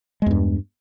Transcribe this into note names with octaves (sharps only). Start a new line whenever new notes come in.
E2 G2 G#3